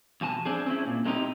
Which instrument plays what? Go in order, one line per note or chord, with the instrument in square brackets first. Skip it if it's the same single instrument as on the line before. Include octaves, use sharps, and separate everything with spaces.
[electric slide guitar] F2 B2 G#5 A5
C4 D4 G#4
C4 C#4 E4
A#2
G#3 A#3 C4 D#4 E4 G4